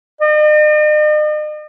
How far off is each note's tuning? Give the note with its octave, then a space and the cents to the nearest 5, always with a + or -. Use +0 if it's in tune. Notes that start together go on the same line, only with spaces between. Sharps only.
D#5 -45